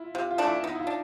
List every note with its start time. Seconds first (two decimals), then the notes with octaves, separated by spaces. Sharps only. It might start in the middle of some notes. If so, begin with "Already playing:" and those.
Already playing: E4 F4
0.15 C3 F4
0.31 F4
0.38 E3 A3 D4
0.47 E4
0.63 B3 D#4
0.75 E4
0.80 F4
0.87 D4